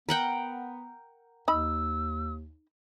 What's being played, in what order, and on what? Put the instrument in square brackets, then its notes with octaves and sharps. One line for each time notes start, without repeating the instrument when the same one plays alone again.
[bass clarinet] B3 [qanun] A#4 F#5 G5
[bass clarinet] D#2 [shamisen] D#4 B5 [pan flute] E6